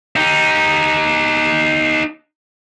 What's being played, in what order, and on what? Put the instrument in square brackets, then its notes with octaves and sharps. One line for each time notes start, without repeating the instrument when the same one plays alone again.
[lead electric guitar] D#4 G4